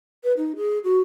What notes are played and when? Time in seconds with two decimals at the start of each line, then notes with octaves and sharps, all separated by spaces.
0.24 B4
0.37 D#4
0.56 G#4
0.84 F#4